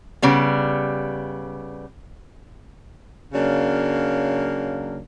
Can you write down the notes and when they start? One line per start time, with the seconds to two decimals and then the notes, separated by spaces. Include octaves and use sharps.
0.22 C#3 G3 B3
3.34 C#3 F#3 A#3 D4